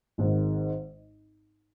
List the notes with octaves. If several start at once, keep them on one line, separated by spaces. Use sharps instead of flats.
G#1 G#2 D#3